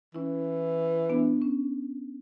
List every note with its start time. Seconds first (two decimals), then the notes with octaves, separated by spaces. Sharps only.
0.15 E3 C#4 E4
1.10 B3 D4
1.42 C#4